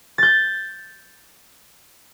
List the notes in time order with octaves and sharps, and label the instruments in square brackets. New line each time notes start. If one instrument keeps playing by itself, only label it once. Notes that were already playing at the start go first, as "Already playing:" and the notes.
[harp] G6 A6